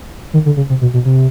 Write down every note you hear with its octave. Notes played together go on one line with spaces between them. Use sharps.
D#3
D3
C#3
C3
B2
B2
C3